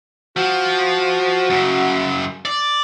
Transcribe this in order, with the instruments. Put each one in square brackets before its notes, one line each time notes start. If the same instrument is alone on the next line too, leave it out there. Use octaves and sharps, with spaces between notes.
[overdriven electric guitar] F3 [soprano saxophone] F#4
[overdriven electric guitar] F#2 C#3
D5